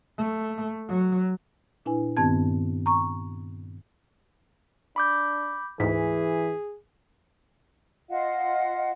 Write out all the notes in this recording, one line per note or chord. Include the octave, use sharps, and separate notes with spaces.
A3
F#3
A#2 D4 E4 B4 G#5
G2 D#3 B3 C4 A5 G#6
A#5 C#6
D4 B5 D6 G6
D2 G#2 E3 G#4 B6
F4 D#5 F5 F#5